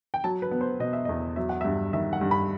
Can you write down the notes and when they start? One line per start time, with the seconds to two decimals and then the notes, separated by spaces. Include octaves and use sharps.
0.14 G5
0.24 F#3 A5
0.42 B4
0.51 B3
0.61 C5
0.80 B2 D#5
0.93 E5
1.05 E2 D#5
1.36 F#3 E5
1.49 F#5
1.61 G2 E5
1.93 D#3 E5
2.13 F#5
2.21 G2
2.31 B5